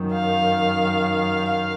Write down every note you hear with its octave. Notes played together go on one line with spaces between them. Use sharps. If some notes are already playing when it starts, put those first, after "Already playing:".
Already playing: F#2 D#3
F5
F5